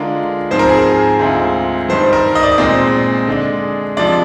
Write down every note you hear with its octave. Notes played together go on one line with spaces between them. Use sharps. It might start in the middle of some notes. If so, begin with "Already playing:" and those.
Already playing: D3 G#3 D4 F4 A#4
G#2 F3 C4 C5
A#4
G#4
A#4
D2 D3 G#3 C4 F4
G2 D#3 G3 C5
A#4
D#5
D5
D#5
A#2 G#3 C4
D3 G#3 D4
C3 F3 G#3 D4 D5